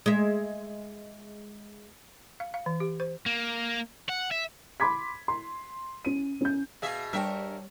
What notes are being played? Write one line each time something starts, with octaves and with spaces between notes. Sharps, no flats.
G#3 E5
F5
F5
E3
G4
C5
A#3
F#5
E5
B5 C6 D6 G#6 B6
C6
C#4 D#7
C#4 G6
B2 G#4 E5 F5
G2 G3 A#4 C5 C#5 E5 G5 A5